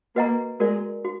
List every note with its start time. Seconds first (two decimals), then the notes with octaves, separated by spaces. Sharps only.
0.15 A#3 F#4 B4 D#5 F#5 A#5
0.60 G#3 F#4 A#4 D5
1.05 F#4